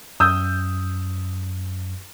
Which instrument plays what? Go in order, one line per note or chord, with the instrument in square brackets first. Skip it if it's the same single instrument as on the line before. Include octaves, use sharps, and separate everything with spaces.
[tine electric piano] F#2 [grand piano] D#6 E6 G6